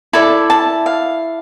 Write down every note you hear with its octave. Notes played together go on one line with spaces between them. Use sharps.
E4 A4 D5 A5
A5
F5